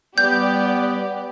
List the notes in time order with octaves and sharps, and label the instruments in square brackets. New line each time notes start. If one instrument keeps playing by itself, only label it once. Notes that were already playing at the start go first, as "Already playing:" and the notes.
[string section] G3 G4 D5 [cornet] B3 [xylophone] G6